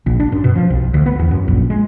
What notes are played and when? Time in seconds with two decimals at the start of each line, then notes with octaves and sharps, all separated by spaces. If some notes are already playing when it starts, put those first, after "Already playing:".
0.06 A#1
0.20 D4
0.32 F#2
0.44 B2
0.56 F3
0.70 B1
0.94 D2
1.06 B3
1.19 E2
1.31 F#2
1.48 A#1
1.70 G#3